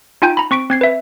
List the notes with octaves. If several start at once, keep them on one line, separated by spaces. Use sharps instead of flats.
D#4 F4 G5 G#5 G6
A#5 B5
C4 C#6 B6 D7
C4 G#6 C7
B4 E5